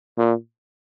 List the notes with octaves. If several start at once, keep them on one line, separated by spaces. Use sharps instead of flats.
A#2